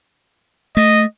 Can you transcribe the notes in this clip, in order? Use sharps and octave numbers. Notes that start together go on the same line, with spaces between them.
A3 D#5